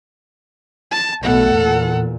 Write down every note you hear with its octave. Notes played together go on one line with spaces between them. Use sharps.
A5
B1 B2 A3 A4 F#5
E2 A#2